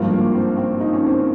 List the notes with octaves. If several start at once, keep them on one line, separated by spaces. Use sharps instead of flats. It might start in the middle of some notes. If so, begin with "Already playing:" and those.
Already playing: G#1 G2 F3 A#3
A#3
C4
C4
D#4
C#4
C4
C#4